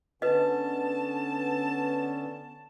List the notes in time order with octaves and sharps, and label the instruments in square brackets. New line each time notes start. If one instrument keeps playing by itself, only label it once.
[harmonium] D3 B3 C#4 [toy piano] B4 D#5 [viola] A5